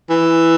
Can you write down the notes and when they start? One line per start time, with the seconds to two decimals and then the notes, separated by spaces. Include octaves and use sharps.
0.10 E3